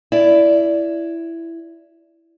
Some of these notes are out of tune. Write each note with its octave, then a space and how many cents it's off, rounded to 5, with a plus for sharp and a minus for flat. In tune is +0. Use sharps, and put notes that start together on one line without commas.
E4 +10 D5 -10